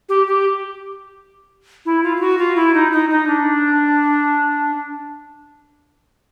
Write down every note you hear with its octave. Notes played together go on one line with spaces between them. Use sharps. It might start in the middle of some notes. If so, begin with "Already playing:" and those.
G4
G4
E4
F4
F4
F#4
F4
E4
D#4
D#4
D#4
D4